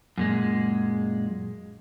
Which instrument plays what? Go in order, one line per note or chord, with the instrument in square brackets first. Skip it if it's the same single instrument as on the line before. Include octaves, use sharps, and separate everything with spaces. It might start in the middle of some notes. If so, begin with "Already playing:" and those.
[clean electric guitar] F#2 A#2 G#3